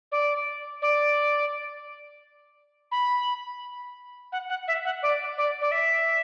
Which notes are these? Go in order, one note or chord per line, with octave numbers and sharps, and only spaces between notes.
D5
D5
B5
F#5
F#5
E5
F#5
D5
D5
D5
E5